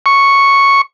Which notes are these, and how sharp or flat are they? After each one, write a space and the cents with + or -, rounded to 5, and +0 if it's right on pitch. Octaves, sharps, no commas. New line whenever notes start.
C#6 -5